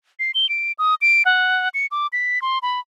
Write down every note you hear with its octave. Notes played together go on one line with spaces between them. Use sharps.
C7
G7
D7
D#6
D7
F#5
C#7
D6
B6
C6
B5